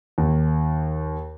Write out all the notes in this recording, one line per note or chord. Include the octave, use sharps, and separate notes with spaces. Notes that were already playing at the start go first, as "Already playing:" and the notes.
D#2